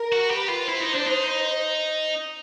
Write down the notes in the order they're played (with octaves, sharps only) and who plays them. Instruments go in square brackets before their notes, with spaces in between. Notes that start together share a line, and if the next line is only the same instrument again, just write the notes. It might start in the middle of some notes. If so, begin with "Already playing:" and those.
Already playing: [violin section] A#4
[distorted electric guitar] F#4
[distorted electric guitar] G4 [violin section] B4
[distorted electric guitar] F4
[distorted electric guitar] E4 [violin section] C5
[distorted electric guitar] D#4
D4
D#4